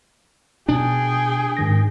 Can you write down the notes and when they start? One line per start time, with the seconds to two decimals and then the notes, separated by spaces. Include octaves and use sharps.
0.69 B2 D4 G#4 G5
1.57 G#2 D#3 A#6